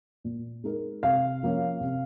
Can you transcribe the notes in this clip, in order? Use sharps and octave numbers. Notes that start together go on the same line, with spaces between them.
A#2
G#3 D#4 A#4
C3 F5
F3 A#3 C#4
C3